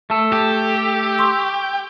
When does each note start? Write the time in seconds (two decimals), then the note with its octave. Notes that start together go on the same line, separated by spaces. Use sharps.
0.10 A3 A4
0.32 G4
1.19 C6 C#6 E6